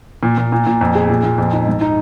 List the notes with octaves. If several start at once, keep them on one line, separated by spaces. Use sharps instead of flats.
A#2
A#2
A#2
A#2
F2
G#4
A#2
A#2
F2
D#4
G#2
D#4